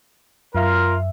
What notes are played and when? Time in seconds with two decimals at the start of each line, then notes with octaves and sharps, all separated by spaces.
0.55 F#2 F4 A#4 E5